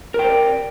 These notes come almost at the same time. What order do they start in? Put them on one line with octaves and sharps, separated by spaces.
A#4 G5 C5 D5